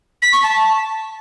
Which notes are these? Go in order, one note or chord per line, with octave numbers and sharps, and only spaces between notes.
B6
C#6
A5